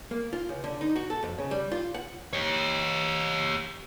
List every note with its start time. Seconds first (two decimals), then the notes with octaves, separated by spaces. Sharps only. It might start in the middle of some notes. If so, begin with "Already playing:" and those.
0.11 A#3
0.33 F4
0.49 C#2
0.64 D3
0.81 D#4
0.96 F#4
1.10 A4
1.23 F2
1.38 C#3
1.51 G3
1.72 F4
1.94 F#5
2.33 G4 C#5